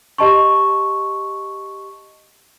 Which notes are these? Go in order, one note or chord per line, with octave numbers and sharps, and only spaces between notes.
G4 D#5 A5 C6 C#6